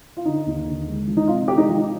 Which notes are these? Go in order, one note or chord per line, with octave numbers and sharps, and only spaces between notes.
F4
D3 D#4
D#2
D3
G#3
F3
D#4
C3 F4
G#3 G4
D#4
F3 F4
D#4